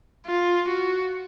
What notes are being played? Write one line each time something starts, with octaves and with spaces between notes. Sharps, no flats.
F4
F#4